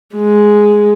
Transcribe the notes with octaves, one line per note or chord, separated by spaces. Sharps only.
G#3